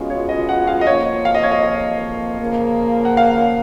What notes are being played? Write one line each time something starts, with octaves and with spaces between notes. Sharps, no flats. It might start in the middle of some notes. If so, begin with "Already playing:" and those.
Already playing: B2 G#3 C#4 F4
C#5
D#5
F#5
F5
D#5
F2 F3 A#3 F4 C#5
F5
D#5
C#5
D#5
D#5
C#3 F3 A#3
F#5
F5